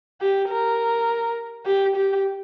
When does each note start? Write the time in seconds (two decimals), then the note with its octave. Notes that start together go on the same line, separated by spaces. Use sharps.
0.21 G4
0.49 A#4
1.66 G4
1.96 G4